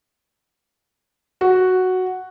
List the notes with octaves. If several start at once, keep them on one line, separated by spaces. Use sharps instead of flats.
F#4